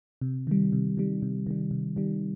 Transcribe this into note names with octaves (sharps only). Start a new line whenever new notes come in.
C3
D#3 G3
C3
D#3 G3
C3
D#3 G3
C3
D#3 G3